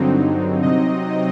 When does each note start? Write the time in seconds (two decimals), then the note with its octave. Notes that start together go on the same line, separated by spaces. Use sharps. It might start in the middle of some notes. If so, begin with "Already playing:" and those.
Already playing: G2 D3 F#3 C4 D#4
0.62 C3 F#3 C4 D#4 D#5